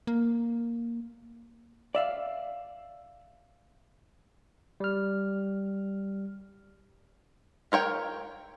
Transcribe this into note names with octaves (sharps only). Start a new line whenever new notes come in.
A#3
D5 E5 F5
G3 F6
F4 A#4 C#5 G5